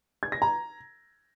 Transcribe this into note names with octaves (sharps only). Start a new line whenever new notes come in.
G#6
A#6
A#5